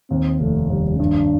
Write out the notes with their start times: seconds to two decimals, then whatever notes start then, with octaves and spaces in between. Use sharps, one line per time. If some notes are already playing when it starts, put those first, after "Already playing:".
0.10 D#2 C4
0.40 F1 A3
0.70 D#2 G3
0.99 G2 D4